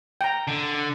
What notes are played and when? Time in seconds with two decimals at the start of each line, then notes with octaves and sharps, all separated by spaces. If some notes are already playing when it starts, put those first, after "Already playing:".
0.21 G5 A#5
0.48 D3